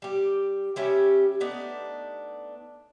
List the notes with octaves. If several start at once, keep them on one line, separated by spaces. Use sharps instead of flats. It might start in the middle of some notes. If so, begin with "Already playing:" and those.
G3 G4
G3 C#4 G4 E5
A3 B3 D4 D#4